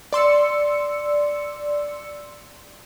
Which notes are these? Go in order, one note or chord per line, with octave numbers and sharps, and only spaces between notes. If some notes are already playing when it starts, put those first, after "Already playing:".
D5 C6 E6 C#7